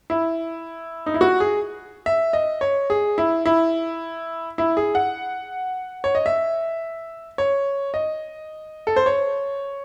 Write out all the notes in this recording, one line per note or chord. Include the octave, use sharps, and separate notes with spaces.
E4
D#4
E4
F#4
G#4
E5
D#5
C#5
G#4
E4
E4
E4
G#4
F#5
C#5
D#5
E5
C#5
D#5
A4
C5
C#5